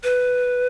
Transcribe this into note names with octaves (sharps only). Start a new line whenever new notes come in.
B4